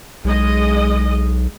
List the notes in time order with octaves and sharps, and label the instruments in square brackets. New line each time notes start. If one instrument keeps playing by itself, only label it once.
[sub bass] B1 [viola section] G#3 D#5